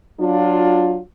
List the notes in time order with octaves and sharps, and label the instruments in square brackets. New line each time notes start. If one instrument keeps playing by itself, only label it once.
[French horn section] F#3 D4 F4